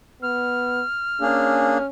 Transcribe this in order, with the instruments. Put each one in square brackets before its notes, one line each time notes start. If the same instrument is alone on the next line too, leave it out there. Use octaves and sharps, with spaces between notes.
[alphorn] B3 [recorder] F6
[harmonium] A#3 D4 G#4 [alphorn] C#4